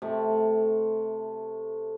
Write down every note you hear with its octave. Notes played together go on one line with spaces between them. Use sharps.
C3 A3